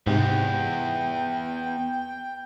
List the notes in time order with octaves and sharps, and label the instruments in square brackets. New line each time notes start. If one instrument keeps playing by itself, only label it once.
[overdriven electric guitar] E2 [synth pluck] G#2 C3 [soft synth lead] G5